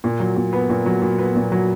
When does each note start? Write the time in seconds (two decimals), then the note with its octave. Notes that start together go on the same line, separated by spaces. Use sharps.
0.04 A#2
0.20 F#3
0.36 A#2
0.53 B3
0.70 A#2
0.86 F#3
1.02 A#2
1.18 B3
1.36 A#2
1.52 F#3